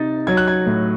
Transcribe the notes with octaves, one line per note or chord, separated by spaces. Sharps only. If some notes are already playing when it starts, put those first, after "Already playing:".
Already playing: C3 D#4 A6
F#3 G#6
F#6
G#6
A2